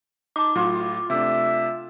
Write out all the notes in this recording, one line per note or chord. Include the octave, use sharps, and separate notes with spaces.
D#4 A5 D6
A2 F#3 F4
C3 A3 D4 E5